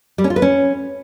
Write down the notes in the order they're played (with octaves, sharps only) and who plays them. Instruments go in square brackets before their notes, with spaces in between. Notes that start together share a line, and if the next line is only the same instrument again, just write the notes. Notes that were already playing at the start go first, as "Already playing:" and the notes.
[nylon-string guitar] G3
C#4
F4
B4
C#4